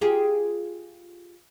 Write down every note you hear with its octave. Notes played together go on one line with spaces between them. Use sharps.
F4 G4 G#4